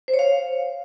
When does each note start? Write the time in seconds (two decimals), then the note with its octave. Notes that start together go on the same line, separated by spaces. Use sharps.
0.08 C5
0.14 C#5
0.19 F5